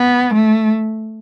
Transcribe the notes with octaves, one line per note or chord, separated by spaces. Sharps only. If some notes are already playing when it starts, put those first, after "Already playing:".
Already playing: B3
A3